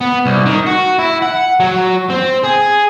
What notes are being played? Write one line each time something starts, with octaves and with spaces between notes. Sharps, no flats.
B3
C2
D#3
F#4
E4
F#5
F#3
C4
G#4